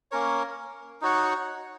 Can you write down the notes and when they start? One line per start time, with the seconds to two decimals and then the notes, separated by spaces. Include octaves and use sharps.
0.11 A#3 C#4 A#4 C#5
1.01 D#4 F#4 C#5 F#5